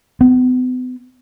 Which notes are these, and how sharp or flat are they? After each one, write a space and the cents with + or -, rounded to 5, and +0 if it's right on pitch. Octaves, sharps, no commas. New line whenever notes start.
B3 +40